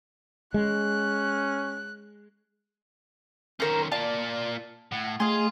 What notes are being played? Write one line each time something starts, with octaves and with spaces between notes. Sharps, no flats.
G#3 C#4 F#6
D#3 C#4 A#4 C5
A#3 F4 D5 A5
A2 F#5
A3 G#4 D#5 F5 C6